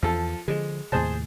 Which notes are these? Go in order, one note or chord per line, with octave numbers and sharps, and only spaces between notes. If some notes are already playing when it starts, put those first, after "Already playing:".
E2 F3 A4
D3 F3 G#3
D#2 A2 C3 G#4 C5 A5